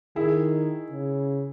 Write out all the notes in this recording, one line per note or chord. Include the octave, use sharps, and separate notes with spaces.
D#3 E4 G#4
C#3